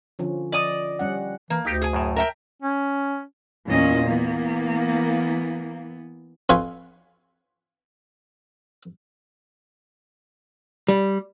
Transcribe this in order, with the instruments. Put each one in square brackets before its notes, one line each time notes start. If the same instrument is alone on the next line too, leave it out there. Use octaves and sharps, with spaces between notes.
[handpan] D3 F3 C#4
[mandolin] D5 D#6 [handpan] D#5
[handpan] G3 C#4 F#5
[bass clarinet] E3 [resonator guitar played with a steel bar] A#3
[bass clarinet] D2 [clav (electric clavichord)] D#4 G4
[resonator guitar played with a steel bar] G#4 G#5
[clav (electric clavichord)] F#2 A2
[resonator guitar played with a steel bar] A#4 E5 G5
[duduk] C#4
[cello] E2 D#5 [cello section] A#2 C#4
[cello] E3 B3 [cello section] A#3
[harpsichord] F2 F4 B4 G#5 C6 C#6
[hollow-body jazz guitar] G3